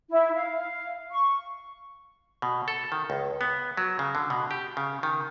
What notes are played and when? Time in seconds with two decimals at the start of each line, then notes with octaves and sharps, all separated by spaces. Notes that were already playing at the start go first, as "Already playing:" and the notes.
0.09 E4
0.34 F5
1.10 C#6
2.42 B2
2.68 A4
2.92 D#3
3.10 C#2
3.41 B3
3.77 F#3
3.99 C#3
4.15 D3
4.30 B2
4.51 G4
4.77 C#3
5.03 D#3